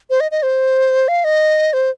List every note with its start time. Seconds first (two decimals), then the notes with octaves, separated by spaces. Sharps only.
0.10 C5
0.20 D#5
0.31 D#5
0.43 C5
1.08 F5
1.24 D#5
1.73 C5